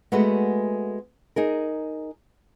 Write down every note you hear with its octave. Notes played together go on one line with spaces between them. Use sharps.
G#3 A3 B3 F#4
D#4 G#4 A#4